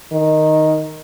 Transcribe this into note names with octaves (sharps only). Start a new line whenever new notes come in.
D#3